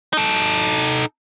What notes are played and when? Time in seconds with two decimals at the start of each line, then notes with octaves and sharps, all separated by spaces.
0.13 D#4 A4